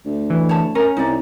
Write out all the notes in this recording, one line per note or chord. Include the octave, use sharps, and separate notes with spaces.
D2
E3
C#5 A5
C#4 A#4
C2 D#4 D5